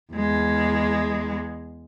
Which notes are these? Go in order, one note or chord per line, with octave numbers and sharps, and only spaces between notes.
E2 G#3